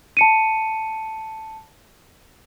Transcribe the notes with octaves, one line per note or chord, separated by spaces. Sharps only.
A5 C#7 D#7